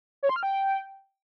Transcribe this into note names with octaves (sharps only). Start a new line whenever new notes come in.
C#5
C6
F6
G5